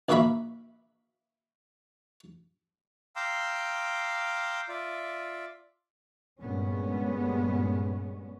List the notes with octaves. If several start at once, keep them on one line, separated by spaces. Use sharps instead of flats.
A#1 D#3 A#3 F#4 E5 B5
F5 G5 A#5 C6 D6 E6
F4 D5 E5
G1 G2 A#2 G#3 B3 C#4